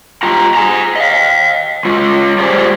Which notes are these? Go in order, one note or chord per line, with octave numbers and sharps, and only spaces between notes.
F4 G4 D#5 A#5
G#4 G#5 A#5
D#5 F5
G#3 F4
G#3 A3 G4 G#4 C5 D5